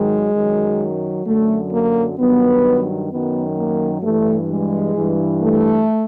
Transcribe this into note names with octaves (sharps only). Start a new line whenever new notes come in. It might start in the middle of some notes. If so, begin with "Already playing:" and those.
Already playing: G#2 D#3 F#3 G#3
F#2 D#3 F#3
F#2 D3 F#3 A3
A#3
G2 D#3 F#3 B3
F#2 D#3 F#3 B3
A#3
G2 E3 A3
G#3
G2 E3
A3